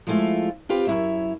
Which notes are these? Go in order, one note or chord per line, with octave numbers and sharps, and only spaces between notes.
F3 G#3 A3 E4 F4
C4 F4 G4 B4
F#2 F3 E4 C#5 E5